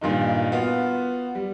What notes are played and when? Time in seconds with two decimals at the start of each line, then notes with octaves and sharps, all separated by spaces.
0.01 G2 A#2 D#3 D#4
0.52 B3 F4 F#4
1.35 G3